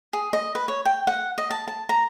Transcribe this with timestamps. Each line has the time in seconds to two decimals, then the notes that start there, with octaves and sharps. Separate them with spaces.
0.13 G#4
0.33 D#5
0.55 B4
0.68 C#5
0.85 G5
1.07 F#5
1.38 D#5
1.50 A5
1.68 A5
1.89 A#5